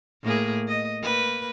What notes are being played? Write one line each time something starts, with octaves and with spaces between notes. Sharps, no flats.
A2 A#3 G#4
D#5
A#3 B4